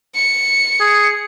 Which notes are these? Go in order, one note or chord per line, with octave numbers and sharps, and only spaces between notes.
C#7
G#4